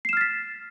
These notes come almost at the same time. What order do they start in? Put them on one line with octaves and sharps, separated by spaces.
C7 E7 F6 A6 B6